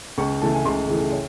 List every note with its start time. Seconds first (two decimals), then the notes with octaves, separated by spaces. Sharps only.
0.18 C#2 C#6
0.42 C#3 E3 A3 A5
0.53 G#5
0.65 C#2 C6
0.88 C#3 E3 A3
1.12 C#5